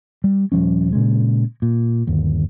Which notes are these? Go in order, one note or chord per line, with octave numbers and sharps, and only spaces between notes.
G3
D#1 F3 G3 C#4
A#2 C#3 G#3
A#2
G1 D#2